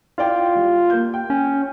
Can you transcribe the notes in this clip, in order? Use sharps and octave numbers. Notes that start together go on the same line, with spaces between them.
E4 F4 D5 G5
G3
A#3 G6
G5
C#4